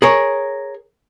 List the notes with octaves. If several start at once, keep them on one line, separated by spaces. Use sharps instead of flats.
G#4 A#4 C#5